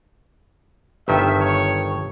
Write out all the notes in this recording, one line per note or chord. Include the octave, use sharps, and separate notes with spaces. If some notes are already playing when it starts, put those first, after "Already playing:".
G1 G2 D#3 E5
C#5